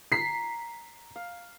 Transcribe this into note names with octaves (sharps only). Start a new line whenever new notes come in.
A#5 B6 C7
F5